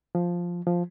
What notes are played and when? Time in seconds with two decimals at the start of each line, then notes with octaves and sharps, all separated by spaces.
0.15 F3
0.67 F3